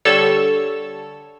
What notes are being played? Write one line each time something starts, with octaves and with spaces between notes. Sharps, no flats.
D3 G3 A4 C#5 E6